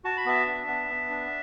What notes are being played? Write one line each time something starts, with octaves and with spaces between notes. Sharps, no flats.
F#4 A5
B5
B3 E5 A5
D4
B3
B3
D4